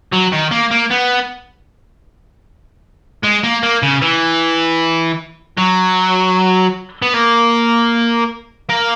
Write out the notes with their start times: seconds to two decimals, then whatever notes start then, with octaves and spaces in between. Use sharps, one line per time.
0.12 F#3
0.32 D#3
0.51 A#3
0.71 A#3
0.90 B3
3.24 G#3
3.44 A#3
3.63 A#3
3.83 C#3
4.02 E3
5.58 F#3
7.02 B3
7.14 A#3
8.69 A#3